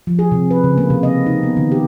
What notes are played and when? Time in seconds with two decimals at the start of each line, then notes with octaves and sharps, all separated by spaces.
0.07 F3
0.19 G#4
0.32 C3
0.51 B4
0.64 C#3
0.78 A#3
0.90 C3
1.03 D#5
1.26 D#4
1.43 B3
1.57 D#3
1.72 G4